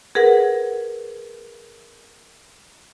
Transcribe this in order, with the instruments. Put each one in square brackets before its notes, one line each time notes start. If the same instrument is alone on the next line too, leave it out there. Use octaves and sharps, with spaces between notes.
[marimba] G#4 A#4 B4 F#5